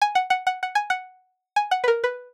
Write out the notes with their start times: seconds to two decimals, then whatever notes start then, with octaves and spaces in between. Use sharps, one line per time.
0.01 G#5
0.15 F#5
0.30 F#5
0.47 F#5
0.63 F#5
0.75 G#5
0.90 F#5
1.56 G#5
1.71 F#5
1.84 B4
1.88 A#4
2.04 B4